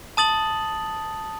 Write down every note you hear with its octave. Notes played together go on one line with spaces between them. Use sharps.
A5 D#6 A6 F#7